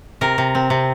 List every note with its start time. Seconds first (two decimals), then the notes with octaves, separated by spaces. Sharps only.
0.21 C3 A#4
0.38 C3
0.55 C4
0.70 C3